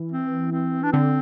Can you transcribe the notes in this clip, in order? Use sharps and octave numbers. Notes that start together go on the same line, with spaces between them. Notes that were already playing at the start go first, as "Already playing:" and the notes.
Already playing: E3
C4
C4
D4
D3 C4